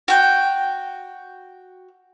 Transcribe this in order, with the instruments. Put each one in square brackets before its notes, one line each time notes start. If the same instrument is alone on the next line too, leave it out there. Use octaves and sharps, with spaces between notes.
[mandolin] F#4 G5